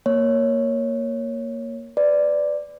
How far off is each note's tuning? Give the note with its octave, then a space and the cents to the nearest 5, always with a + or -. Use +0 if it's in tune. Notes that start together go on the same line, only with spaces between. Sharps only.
A#3 +0 C#5 +0
B4 +35 D5 +0